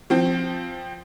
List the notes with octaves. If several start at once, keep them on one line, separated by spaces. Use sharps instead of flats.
F3 C4